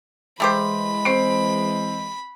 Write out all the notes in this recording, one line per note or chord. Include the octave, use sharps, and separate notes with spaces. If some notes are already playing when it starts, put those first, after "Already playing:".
E3 G#3 A3 G4 C5 B5
C4 C7 D7